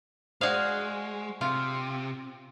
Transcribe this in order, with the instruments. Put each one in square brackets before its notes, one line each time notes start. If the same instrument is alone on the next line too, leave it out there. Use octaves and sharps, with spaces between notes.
[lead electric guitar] G#3 [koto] F#4 G#4 F5 [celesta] C5 D5 F#5
[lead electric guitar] C3 [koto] F4